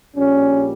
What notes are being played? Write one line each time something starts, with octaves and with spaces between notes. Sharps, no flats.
A#1 A#2 G3 C#4